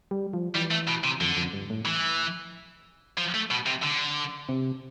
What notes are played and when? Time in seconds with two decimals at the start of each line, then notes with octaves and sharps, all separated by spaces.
0.11 G3
0.34 F3
0.55 E3 G3
0.71 A3
0.88 B2
1.04 C3
1.21 F2 D3
1.37 F2
1.53 G2
1.70 A2
1.86 E3
3.18 F3
3.35 A3
3.50 B2
3.66 C3
3.83 D3
4.49 C3